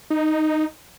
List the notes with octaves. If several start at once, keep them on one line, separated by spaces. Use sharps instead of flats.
D#4